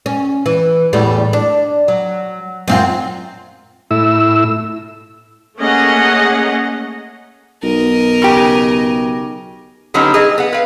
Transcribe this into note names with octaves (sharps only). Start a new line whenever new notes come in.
C#4
E3
E2 A2 G3
D4
F#3
F#2 C4 F4
A2 E4 E6
A3 A#3 C#4 G#4 D#5 F#5
B1 A#4 D#5
C#3 G4
D3 F#3 G3 B3 C#4 D#4
G#4 D#5
B3 F#5
B4 F5